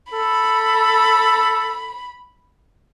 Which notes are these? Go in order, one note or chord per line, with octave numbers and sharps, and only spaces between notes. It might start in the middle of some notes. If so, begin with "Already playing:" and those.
A4 B5